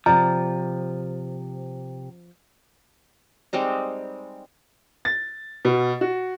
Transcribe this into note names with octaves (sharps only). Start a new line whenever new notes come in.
C3 F3 C5 D5 A#5
G3 G#3 C4 D#4
A6
B2
F#4